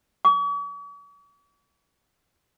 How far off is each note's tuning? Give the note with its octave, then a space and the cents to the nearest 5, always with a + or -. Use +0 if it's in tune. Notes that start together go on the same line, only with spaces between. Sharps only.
C#6 +45